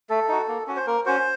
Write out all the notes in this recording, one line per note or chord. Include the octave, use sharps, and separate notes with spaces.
A3 A4
D#4 F#4
A#3
C#4 F#4
C5
A#3 A#4
C#4 F#4 C5